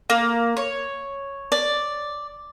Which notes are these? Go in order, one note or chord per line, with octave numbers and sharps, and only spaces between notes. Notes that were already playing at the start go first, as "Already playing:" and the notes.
A#3
C#5
D5